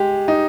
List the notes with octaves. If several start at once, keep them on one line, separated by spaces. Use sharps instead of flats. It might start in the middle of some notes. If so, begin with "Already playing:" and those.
Already playing: G#3 G4
D#4